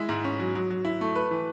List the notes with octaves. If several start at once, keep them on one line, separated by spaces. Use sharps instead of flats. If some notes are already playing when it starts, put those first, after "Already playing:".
Already playing: G#3 E4
G#2
C#4
F#3
F#3
F#3
E4
A3
B4
E3